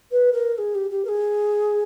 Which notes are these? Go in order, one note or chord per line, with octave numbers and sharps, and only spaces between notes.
B4
A#4
A#4
G#4
G4
G4
A#4
G#4